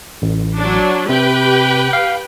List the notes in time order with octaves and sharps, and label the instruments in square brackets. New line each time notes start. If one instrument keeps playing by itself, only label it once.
[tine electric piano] A1
[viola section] F#3 D4
[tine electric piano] C3 [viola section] G4 B4 G5
[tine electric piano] F5